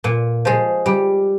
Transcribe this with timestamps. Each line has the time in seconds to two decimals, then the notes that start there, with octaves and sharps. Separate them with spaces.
0.04 A#2
0.45 F3 G#3
0.86 G3